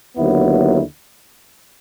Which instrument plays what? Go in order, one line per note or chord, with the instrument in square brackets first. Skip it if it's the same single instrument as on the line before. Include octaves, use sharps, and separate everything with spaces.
[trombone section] D#2 D3 F#3 B3 E4